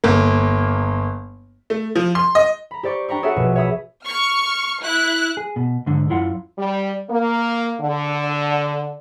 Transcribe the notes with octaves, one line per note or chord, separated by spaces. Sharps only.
G1 A#3
A3
F3
C6
D#5
A#5 B5
G4 C5 D5 C#6
D4 G5 A#5 B5 C#6
F#4 G#4 A4 C#5 E5 F#5
A#1 B2
C#5 E5 B5 D#6
C#6 F6
E4 F#6
G#4
B2
G#2 D3
F#2 E4 F4 F#5
G3
A#3
D3